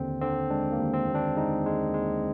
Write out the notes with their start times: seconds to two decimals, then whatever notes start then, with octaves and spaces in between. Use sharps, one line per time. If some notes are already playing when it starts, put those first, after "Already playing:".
Already playing: D#2 D3 C4
0.21 D3 C4
0.50 G#3 D4
0.72 A#3
0.79 D#2
0.94 C4
1.08 D#2
1.15 D4
1.36 G#3 D#4
1.66 G#3
1.94 G#3